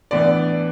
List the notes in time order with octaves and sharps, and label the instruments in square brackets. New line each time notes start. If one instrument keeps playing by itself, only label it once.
[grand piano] A2 E3 B3 D4 D5